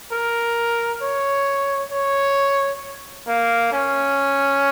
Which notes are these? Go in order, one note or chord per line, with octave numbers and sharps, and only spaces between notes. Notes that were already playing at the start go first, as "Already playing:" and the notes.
A#4
C#5
C#5
A#3
C#4